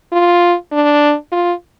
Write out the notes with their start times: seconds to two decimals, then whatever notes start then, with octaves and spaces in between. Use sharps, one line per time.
0.13 F4
0.72 D4
1.32 F4